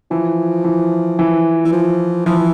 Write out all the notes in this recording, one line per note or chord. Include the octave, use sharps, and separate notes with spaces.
E3 F3
E3
E3
E3
F3
E3 F3